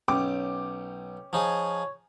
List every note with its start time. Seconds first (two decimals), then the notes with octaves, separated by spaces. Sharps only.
0.08 B1 C#4 G5 D6
1.33 F3 D#4 G#4 C#5